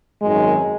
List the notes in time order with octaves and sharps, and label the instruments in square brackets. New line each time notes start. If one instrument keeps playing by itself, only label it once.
[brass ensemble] G#1 F#2 D#3 G#3